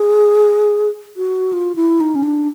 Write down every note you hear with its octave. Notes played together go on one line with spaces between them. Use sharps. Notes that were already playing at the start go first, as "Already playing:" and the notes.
Already playing: G#4
F#4
F4
E4
D#4
C#4
D4